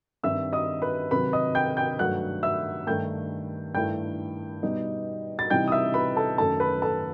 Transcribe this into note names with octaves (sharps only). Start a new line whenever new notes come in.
G2 D#3 G3 C4 E5 E6
D#5 D#6
B4 B5
C3 D#3 F#3 B4 B5
D#5 D#6
G5 G6
G5 G6
G2 D#3 F#3 A3 F#5 F#6
E5 E6
G2 D#3 A3 G5 G6
G2 D#3 A3 E4 G5 G6
B2 G3 B3 D#4
A6
C3 E3 G3 D#4 G5 G6
D#6
E5 E6
B4 B5
A4 A5
F#2 D#3 A3 A4 A5
B4 B5
A4 A5